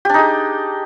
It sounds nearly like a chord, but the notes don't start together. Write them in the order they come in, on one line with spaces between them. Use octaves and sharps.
G4 D4 D#4 G#4